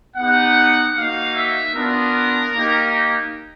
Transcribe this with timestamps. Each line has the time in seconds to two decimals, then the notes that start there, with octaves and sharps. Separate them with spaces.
0.17 B3 D#4 G4 F#5
0.96 A#3 D#4 F#4 F5
1.35 E5
1.74 B3 D4 F4 A#4
2.53 A#3 D#4 G4